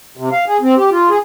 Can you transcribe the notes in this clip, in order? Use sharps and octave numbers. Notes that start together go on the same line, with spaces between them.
C3
F5
G#4
C4
G4
F4
G#4